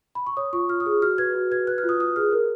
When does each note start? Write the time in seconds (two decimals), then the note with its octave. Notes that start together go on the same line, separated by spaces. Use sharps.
0.15 B5
0.27 C#6
0.37 C#5 D#6
0.53 F4 C#6
0.69 F4 F6
0.80 D#6
0.86 G#4
1.02 F#4 F6
1.18 B4 G#6
1.35 F#4
1.51 B4 G#6
1.67 B4 F#6
1.78 F6
1.84 F4
1.89 D#6
2.00 F4 D#6
2.16 G#4 F6
2.32 A#4